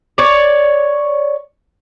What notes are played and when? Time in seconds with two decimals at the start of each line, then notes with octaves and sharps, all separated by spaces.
0.18 C#5 D5